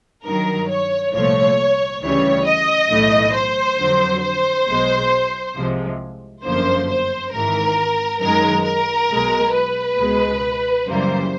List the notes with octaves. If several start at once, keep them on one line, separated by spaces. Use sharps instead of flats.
G2 D#3 F#3 A#4
C#5
C2 A#2 F3 A3 C#5
D2 C#3 E3 G3 C#5
D#5
B1 A2 E3 A3
C5
F2 D3 F#3
C5
B1 B2 G#3
C2 C3 F3 G#3
G1 F#2 D3 F3 A#3 C5
C5
G#1 G#2 E3 A#4
F#2 D#3 G#3 A#4
A#4
B1 B2 G#3
B4
C#2 B2 G#3
F#2 C#3 E3 G3 A#3 C5